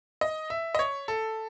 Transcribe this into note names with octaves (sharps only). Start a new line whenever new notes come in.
D#5
E5
D#5
C#5
A4